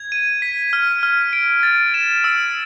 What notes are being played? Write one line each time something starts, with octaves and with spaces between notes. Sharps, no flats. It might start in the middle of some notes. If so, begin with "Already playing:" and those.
Already playing: G#6
D#7
B6
F6
F6
D7
A6
E7
E6